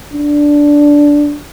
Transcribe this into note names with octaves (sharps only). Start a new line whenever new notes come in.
D4